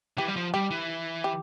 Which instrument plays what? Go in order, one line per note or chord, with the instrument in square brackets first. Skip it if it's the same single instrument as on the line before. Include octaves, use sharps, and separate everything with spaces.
[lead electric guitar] E3 [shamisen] G4
[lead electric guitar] G3
F3
[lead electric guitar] G3 [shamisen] G4
[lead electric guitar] E3
[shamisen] G4